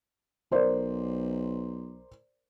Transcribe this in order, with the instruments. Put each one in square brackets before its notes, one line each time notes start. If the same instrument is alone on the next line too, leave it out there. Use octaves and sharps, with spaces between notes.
[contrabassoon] B1 [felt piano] A#4 C5 D5